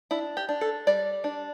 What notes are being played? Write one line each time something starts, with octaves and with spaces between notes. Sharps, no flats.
D4 E4
G4
D4
A4
G3 D5
D4